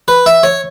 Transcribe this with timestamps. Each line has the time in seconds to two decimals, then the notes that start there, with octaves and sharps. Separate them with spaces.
0.08 B4
0.26 E5
0.43 C#5